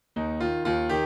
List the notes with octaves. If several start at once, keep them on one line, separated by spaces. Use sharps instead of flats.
D#2 D#4
D#3 F4
D#2 F4
D#3 G4